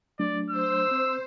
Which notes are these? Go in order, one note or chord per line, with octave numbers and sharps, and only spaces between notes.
F#3 A3 D4 D5
C5 E6
C4